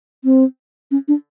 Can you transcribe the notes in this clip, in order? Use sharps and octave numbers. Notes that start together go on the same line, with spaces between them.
C4
C#4
D4